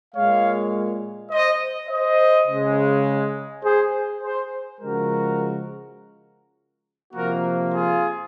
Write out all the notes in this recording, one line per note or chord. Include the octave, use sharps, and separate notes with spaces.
A#2 G#3 C#5 F5
C5 D#5
C5 D#5
C#3 G#3
G#4 C5
G#4 C5
C#3 F3 G#3 F#4 A#4
C3 F3 A#3 F#4 A#4
F4 G#4